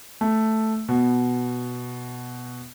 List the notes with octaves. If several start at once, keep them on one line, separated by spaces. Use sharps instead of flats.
A3
B2